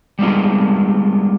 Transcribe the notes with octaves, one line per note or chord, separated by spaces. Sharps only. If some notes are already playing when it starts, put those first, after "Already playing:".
G3 G#3 B3 D#4 F4